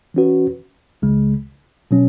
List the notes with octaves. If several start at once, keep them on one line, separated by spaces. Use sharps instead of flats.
E3 C#4 F#4 B4
C#2 C#3 G#3
B2 F#3 C#4